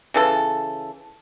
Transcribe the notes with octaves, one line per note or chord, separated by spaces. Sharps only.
C#3 E3 A4